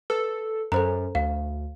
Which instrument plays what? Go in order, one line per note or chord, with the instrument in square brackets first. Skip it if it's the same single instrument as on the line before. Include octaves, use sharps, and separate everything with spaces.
[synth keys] A4 [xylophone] B4
[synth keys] F#2 [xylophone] A4 C5 A#5
[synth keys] D2 [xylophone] F5